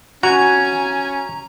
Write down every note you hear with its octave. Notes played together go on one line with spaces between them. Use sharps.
C#4 F#4 G#5 A#5